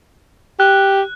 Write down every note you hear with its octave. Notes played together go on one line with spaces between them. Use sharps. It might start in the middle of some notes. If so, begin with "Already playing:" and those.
G4 F#6